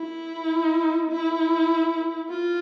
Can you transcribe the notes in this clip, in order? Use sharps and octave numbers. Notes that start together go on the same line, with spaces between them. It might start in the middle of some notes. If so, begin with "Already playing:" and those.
Already playing: E4
E4
F4